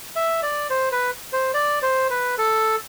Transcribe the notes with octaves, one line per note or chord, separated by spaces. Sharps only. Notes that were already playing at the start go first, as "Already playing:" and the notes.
E5
D5
C5
B4
C5
D5
C5
B4
A4